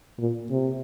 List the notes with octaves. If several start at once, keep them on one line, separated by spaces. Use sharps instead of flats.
A#2
C3